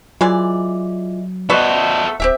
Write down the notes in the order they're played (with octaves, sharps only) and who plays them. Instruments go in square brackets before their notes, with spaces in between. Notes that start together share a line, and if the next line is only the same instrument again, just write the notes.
[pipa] E3 G#3 D5 [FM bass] F#3 [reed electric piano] F4
[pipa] A3 B3 F#4 [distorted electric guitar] A4 C5 [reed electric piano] D5 D#5
[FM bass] D1 [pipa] C4 G4 E5